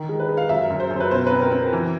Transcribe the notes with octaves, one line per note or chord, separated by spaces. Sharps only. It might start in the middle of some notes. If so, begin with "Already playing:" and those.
Already playing: D#3
G#3
B4
G#3
F5
F#2 E5
F#2
C5
F#2
B4
B2 C5
B4
C4
A#4
C4
E3